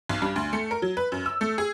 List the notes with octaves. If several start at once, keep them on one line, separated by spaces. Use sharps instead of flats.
B1
G2
D2
A3
A#4
F#3
B4
F#2
E6
A3
G#4